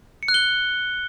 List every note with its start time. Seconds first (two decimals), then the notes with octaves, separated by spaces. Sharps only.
0.23 C#7
0.28 F#6
0.34 G7